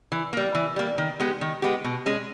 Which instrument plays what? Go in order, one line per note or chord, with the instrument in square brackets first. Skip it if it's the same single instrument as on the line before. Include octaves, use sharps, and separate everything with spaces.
[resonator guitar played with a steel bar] E3
G3 A#3
E3
G3 A#3
D#3
G#3 B3 G4
D#3
G#3 B3 G4
B2
G#3 C#4